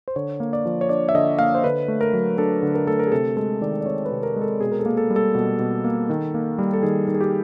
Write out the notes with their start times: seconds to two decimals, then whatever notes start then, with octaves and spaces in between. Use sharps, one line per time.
0.08 C5
0.16 D3 C#5
0.40 A#3
0.53 D5
0.65 F3
0.81 C#5
0.89 D4 D5
1.09 E5
1.15 D3 D#5
1.39 A#3 F5
1.55 C5
1.64 D3 B4
1.88 A3
2.01 A#4
2.13 F#3
2.38 D4 A4
2.63 D3
2.75 A#4
2.87 A3 A4
2.99 A#4
3.07 G#4
3.12 C3 A4
3.37 G#3 A4
3.61 D#3 D5
3.81 D5
3.86 C4 C#5
4.06 B4
4.11 C3
4.23 A#4
4.36 G#3
4.41 A4
4.60 B2 G#4
4.72 A#4
4.79 A4
4.86 A#3
4.97 A4
5.10 G3
5.16 A4
5.35 B2
5.59 B2
5.84 A#3
6.10 D#3
6.34 A#3
6.58 G3
6.73 A4
6.83 D#3 G#4
7.08 D#3
7.14 G#4
7.21 G4